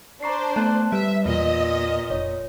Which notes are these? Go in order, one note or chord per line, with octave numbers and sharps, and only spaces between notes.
D4 C5 A#5 C#6 C7
A3 B3 A5 F#6
G3 B4 E5
E2 A#2 D#5
F1 C#5